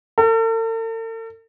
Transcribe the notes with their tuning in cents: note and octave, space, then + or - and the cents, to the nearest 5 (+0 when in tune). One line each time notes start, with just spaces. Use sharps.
A4 +45